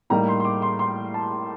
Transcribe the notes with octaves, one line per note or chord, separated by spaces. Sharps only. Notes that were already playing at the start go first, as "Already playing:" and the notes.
A2 G3 A#3 D#4 A#5
C6
C6
D6
C6
C6
A5